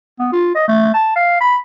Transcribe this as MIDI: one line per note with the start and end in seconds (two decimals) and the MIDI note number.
0.19 0.30 59
0.32 0.52 65
0.55 0.68 75
0.68 0.89 57
0.94 1.11 81
1.16 1.38 77
1.40 1.56 83